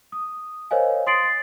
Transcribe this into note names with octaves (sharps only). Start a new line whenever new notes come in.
D#6
A#4 C5 C#5 D#5 F5 G#5
C6 D#6 A6 C7 D7 F#7
A6